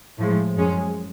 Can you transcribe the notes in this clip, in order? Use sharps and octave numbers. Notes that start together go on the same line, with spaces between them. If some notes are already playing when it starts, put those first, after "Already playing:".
A2 F3 G#3
F#2 F3 G#3 C#4